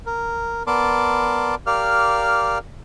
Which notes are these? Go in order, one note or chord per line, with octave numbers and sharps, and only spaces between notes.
A#4
B3 A#4 D5 A5 C6 D6
G4 A#4 D5 F5 F6